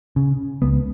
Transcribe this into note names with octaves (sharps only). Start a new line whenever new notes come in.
C#3
C#2 B3